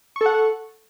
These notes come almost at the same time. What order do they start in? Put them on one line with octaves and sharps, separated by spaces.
C#6 A4 F#5